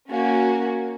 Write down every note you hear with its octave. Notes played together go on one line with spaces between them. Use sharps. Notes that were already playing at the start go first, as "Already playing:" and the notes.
A#3 C#4 F#4